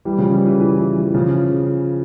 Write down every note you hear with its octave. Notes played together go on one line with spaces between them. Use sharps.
E3 G3
C#3 F3
E3 G3
E3
E3
E3
E3
C#3 F3